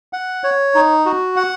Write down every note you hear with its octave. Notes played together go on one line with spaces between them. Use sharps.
F#5
C#5
D#4
F#4
F#5